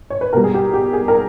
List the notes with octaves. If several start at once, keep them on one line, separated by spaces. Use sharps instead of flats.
C#5
B4
B2 G3 A#4
G#4
G4
G4
G#4
A#4